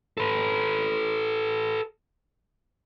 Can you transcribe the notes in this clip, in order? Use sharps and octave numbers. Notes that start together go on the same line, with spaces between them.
A4 B4